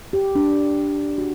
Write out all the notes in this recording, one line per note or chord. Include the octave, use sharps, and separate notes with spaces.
G4
D4
F#4